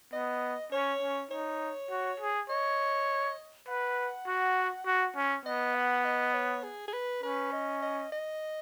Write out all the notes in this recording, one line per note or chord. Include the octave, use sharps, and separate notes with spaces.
B3 D#5
C#4 C#5
C#4
D#4 C#5
F#4
G#4
C#5 D#5
B4 F#5
F#4
F#4
C#4
B3 D#5
F#5
D#5
C#5
G#4
G#4
B4
C#4 B4
D#5
D#5
D#5